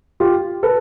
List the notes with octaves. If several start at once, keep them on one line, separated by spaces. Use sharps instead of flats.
F4 G4
A4 B4